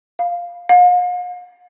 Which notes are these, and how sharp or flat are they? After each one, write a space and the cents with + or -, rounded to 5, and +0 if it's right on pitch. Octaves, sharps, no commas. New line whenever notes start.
F5 +0
F5 +45